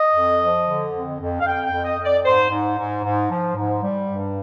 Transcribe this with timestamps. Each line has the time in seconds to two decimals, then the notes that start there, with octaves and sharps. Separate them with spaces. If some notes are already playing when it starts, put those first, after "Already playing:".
Already playing: D#5
0.13 F2
0.40 F3
0.67 D3
0.93 F2
1.19 F2
1.41 F5
1.46 F2 G5
1.65 G5
1.71 F2
1.84 D#5
1.98 F2
2.04 D5
2.24 G#2 C5
2.50 G#2
2.78 G#2
3.03 G#2
3.30 F3
3.56 G#2
3.82 G3
4.09 G2